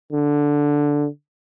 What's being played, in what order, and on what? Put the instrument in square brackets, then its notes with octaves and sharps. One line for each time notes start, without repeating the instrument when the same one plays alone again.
[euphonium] D3